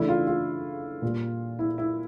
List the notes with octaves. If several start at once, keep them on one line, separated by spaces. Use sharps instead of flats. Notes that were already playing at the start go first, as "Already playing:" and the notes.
Already playing: C#3 E3 A3 D4 E4
F4
F4
A#2 G3 A#3
E4
E4